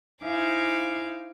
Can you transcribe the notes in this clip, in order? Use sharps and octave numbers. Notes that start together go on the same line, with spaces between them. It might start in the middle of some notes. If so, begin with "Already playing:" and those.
D#4 E4 C5 F5 G#5 D6